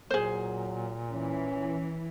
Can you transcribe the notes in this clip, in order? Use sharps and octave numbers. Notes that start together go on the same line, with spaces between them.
A#2 F#3 G#4 C5
E3 C#4